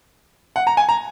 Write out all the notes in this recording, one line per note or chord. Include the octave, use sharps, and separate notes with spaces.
F#5
A#5
G#5
A#5